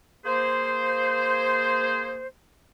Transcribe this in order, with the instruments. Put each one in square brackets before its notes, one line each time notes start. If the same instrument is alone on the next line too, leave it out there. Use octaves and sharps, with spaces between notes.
[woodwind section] A#3 G#4 C5